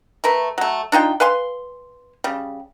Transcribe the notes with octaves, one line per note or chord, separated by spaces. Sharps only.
A3 A#4 B4
F#3 A3
D4 D#4 F4 G5
B4 F5 G#5 C6
C#3 G3